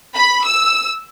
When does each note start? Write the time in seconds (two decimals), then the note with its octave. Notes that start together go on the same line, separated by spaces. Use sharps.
0.16 B5
0.45 E6